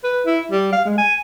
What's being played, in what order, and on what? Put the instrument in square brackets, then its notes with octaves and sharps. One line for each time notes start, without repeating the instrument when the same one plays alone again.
[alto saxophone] B4
E4
G3
F5
G#3
G#5